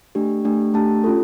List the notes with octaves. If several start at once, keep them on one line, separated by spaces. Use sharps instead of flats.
A3 D4 G4
A3 D4 G4
A3 D4 G4 A5
C#4 F4 A4